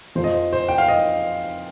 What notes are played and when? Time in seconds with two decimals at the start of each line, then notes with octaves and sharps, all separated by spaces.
0.15 F2 F3 C5
0.24 D#5
0.33 C5
0.53 C5
0.68 G5
0.78 F5
0.88 D#5